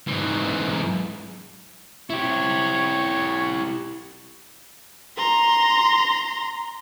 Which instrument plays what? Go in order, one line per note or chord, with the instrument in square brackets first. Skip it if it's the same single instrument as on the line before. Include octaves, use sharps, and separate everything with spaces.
[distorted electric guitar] G#2 E3
[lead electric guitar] E4 G4 [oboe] C#5
[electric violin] A#5 C6